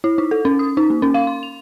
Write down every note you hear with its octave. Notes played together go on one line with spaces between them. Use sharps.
E4
D#4
A4
C#4
D#6
D#4
A#3
C#4
F5
C6
F7